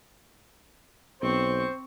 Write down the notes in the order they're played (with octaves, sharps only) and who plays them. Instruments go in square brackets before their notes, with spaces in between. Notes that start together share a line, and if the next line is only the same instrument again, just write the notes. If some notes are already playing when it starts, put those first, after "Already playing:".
[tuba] B1 [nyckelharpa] C4 C#6 [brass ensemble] C5